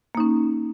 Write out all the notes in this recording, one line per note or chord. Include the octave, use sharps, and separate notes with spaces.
A#3 C#4 D#4